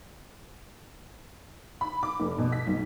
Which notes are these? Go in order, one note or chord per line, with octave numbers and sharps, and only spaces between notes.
B5
D6
F1
B2
B6
B1